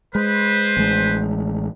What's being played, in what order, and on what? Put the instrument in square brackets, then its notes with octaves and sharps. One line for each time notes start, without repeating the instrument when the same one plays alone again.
[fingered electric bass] G#3 [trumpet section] B4 C5
[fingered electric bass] A1 G#3